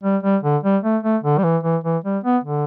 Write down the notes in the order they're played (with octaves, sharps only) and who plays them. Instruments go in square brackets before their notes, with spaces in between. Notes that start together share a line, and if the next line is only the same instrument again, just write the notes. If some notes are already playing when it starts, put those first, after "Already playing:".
[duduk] G3
G3
D3
G3
A3
A3
D3
G3
E3
E3
E3
G3
B3
D3